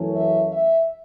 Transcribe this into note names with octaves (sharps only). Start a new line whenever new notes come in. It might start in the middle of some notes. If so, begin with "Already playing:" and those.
Already playing: F#2 E3 A3 C#4
E5
E5